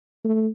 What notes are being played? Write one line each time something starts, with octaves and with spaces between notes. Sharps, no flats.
A3